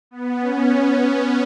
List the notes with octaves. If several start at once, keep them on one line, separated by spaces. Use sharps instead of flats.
B3
C#4
B3